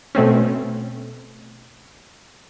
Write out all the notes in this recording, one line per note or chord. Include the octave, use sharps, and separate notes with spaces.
B2 A3 C4 C#4